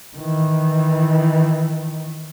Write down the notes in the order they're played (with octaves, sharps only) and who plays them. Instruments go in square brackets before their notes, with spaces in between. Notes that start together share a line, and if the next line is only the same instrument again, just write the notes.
[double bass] D#3 E3